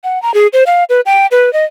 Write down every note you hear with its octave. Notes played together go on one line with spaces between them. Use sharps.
F#5
A#5
G#4
C5
F5
B4
G5
B4
D#5